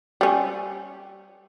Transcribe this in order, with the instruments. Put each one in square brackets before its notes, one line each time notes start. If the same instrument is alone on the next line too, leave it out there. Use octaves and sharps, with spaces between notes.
[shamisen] G3 C#4